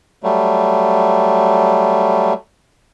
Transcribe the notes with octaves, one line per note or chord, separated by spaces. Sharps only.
F#3 G3 A3